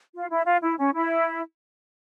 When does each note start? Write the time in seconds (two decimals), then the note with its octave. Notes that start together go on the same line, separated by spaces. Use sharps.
0.14 F4
0.30 E4
0.46 F4
0.63 E4
0.78 C#4
0.94 E4